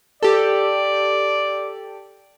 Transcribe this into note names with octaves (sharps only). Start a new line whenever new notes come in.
G4 A4 D5